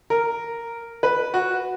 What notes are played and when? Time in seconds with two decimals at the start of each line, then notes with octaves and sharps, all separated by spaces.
0.10 A#4
1.03 B4
1.34 F#4